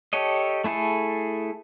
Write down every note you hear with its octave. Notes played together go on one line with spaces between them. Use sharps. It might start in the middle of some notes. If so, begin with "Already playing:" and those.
G4 A4 C#5 D#5
A3 E4 G#4 A4